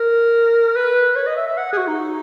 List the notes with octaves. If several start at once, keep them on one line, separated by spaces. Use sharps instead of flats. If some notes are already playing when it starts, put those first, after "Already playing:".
Already playing: A#4
B4
C#5
D#5
E5
E5
F#5
G#4
F#4
D#4